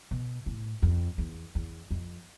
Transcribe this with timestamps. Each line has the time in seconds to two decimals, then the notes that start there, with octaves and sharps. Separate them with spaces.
0.11 B2
0.46 A2
0.82 F2
1.18 E2
1.55 E2
1.91 F2